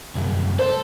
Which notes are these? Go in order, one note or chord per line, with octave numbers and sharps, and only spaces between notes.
C2 F#2
A4 C5